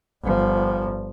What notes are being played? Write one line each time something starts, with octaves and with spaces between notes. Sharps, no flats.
G1 F3